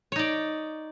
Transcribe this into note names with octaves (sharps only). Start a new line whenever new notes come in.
D#4 C#5 D5